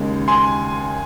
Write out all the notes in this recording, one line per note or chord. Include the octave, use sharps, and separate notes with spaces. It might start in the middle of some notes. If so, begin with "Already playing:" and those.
Already playing: D#2 C#3 G#3
G#5 C6